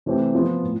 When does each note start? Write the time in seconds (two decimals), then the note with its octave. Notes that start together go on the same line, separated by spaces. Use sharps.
0.06 C3 E3 A3 C4 G4
0.35 F3 B3 F4 B4
0.63 A2